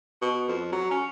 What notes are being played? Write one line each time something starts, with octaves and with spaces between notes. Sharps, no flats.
B2
F2
F#3
C#4